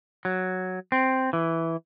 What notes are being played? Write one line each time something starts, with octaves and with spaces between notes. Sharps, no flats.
F#3
C4
E3